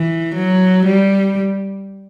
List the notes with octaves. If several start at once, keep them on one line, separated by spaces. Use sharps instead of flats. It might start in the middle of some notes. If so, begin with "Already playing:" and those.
Already playing: E3
F#3
G3